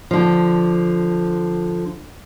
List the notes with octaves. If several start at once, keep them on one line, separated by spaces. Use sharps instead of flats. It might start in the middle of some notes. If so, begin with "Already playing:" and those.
D3 F3